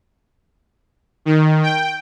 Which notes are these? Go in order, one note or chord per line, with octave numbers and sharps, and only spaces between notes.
D#3
G5